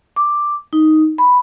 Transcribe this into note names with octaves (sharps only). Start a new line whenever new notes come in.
D6
D#4
B5